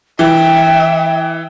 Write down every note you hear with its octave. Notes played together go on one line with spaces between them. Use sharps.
E3 E5 G5